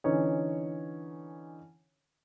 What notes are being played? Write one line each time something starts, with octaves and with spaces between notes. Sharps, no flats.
D3 E3 C#4 D#4 C#5